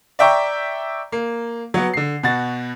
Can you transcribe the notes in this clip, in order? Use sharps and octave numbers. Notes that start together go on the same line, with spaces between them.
D5 E5 G5 A#5 C#6
A#3
F#3 B3
D3 C7
B2 F#4 A6